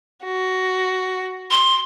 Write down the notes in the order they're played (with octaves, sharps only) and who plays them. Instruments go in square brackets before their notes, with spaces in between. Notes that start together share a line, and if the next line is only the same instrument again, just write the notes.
[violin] F#4
[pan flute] C6